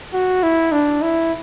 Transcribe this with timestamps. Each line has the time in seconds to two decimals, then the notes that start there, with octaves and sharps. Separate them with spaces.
0.13 F#4
0.43 E4
0.72 D4
1.02 E4